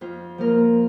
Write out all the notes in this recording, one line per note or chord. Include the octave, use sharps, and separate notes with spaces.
F2 F4
F3 A#3 A#4